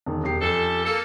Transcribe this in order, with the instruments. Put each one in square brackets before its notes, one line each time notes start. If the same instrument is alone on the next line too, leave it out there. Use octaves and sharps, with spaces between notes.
[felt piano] E1 D#3
E1 G4 C7
[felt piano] F2 [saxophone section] C#4 G4 A4
[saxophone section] A#3 A4